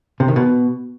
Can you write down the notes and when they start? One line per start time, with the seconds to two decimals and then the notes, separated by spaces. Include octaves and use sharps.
0.20 C3
0.28 D#3
0.36 B2